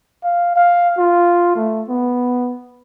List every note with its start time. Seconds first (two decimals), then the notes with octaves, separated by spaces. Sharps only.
0.24 F5
0.56 F5
0.98 F4
1.56 A3
1.89 B3